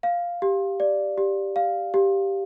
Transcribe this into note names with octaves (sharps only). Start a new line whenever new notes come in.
F5
G4
D5
G4
F5
G4